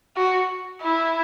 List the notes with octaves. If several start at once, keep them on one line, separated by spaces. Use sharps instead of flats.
F#4
E4